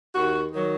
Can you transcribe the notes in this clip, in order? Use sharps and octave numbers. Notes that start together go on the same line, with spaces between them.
D#2 F#4
D#3 F#3